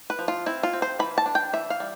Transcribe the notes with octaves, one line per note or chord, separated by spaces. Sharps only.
B4
F3
F4
C4 E4
F4
C4
C5
E3 B5
A5
D4
G5
E3 E5
F5
G3